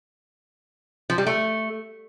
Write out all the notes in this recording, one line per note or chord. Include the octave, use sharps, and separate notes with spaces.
F3
G3
A3